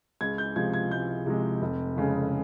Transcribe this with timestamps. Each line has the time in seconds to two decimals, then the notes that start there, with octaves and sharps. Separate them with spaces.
0.21 C#2 G#6
0.38 G6
0.56 C3 F3 G#3 G#6
0.74 G#6
0.91 C#2 G6
1.26 C3 F3 G#3
1.61 F1
1.96 F2 C#3 G#3